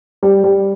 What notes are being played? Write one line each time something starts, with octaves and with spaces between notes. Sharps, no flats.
G3
G3